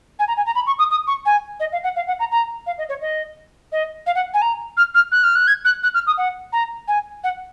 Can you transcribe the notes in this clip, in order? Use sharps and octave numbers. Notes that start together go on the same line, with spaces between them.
G#5
A#5
G#5
A#5
B5
C#6
D#6
D#6
C#6
G#5
D#5
F5
F#5
F5
F#5
A#5
A#5
F5
D#5
C#5
D#5
D#5
F5
F#5
G#5
A#5
F6
F6
F#6
F6
F#6
G#6
F#6
F#6
F6
D#6
F#5
A#5
G#5
F#5